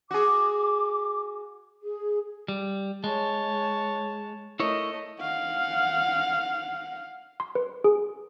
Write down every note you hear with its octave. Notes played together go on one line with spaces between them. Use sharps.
F#4 G#4 D6
G#4
G3
G#3 C#5 A5
A3 E4 A#4 C#5 D#5
F5 F#5
C6
B4
G#4